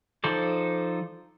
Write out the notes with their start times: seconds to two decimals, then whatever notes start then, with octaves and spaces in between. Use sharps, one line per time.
0.24 F3 D#4 A4 C5 D5